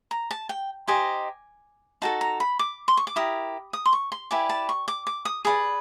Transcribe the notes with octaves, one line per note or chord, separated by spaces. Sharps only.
A#5
A5
G5
D#4 G4 C5 D#5 G#5
D#4 F#4 A4 A5
A#5
B5
D6
C6
C#6
D6
E4 G4 A#4 D#6
D#6
C6
C#6
C6
E4 G4 B4 D5 G#5
A5
C#6
D6
D6
D#6
G#4 B4 D5 D#6